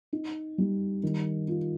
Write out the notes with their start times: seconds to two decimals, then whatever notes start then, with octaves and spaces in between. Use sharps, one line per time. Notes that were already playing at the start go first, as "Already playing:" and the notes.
0.13 D#4
0.58 G3
1.03 D#3
1.48 F4